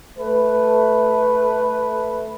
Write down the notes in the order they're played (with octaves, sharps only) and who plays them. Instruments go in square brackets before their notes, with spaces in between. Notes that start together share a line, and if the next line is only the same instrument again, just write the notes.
[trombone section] A3 B4